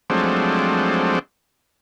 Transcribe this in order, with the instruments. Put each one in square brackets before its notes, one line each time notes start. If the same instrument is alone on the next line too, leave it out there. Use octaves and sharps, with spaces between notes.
[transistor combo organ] F3 F#3 G#3 A3 C4 D4